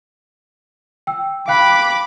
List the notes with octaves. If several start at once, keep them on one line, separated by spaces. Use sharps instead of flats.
G5 E6
F5 G5 B5 D6 F#6